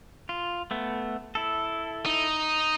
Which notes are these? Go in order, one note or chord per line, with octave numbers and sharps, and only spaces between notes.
F4
A3 B3
E4 A4
D#4